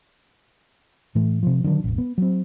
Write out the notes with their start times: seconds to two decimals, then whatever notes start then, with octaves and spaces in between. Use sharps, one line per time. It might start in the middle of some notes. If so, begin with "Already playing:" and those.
1.15 A2 E3 A3
1.43 C3 F3
1.64 D3 D#3 F#3 D4
1.84 E1 A1
1.98 B3
2.18 F#3 C4